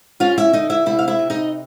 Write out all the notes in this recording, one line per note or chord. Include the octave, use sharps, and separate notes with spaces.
C#4 F4 F5
E4 E5
D3 D#4 D#5
E4 E5
C3 E4 E5
F5
E4 E5
C3
D#4 D#5